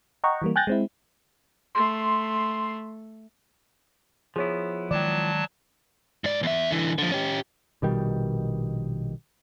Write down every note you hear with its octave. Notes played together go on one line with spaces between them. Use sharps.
D#5 F#5 G5 A#5 C#6
E3 G3 A#3
G5 G#5 F#6 G6 A6 A#6
G#3 C4 E4
A3 C6
F3 B3 E4 G#4 C#5
D#3 F#3 G#3 D5 G5 A5
G#2 D5
E2 E5
D3 E3
D3 F3
C#4 G4
A#1 B2 D#3 G3